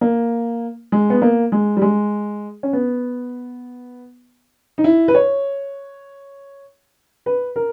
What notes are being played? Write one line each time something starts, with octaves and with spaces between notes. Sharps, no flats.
A#3
G#3
B3
A#3
G#3
G3
G#3
C#4
B3
D#4
E4
B4
C#5
B4
A#4